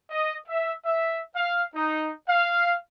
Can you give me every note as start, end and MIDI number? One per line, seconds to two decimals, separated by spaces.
0.10 0.34 75
0.48 0.71 76
0.85 1.19 76
1.36 1.63 77
1.75 2.09 63
2.28 2.75 77